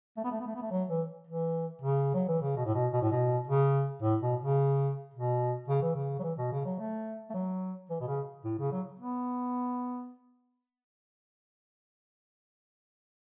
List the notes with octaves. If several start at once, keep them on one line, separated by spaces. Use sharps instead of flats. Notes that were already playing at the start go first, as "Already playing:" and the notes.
A3
B3
A3
B3
A3
B3
A3
F#3
E3
E3
C#3
F#3
E3
C#3
B2
A2
B2
B2
A2
B2
C#3
A2
B2
C#3
B2
C#3
E3
C#3
F#3
E3
B2
C#3
F#3
A3
A3
F#3
E3
B2
C#3
A2
C#3
F#3
B3